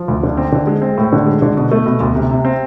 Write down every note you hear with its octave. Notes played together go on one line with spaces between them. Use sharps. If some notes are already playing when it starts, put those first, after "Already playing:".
Already playing: F3
D2
D3
C4
D3
G#3
C4
A2
D3
G#3
D3
B2
A3
B2
D2
C3
C3
C4